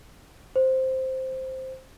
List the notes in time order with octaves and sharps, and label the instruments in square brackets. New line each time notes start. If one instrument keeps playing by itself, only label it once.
[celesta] C5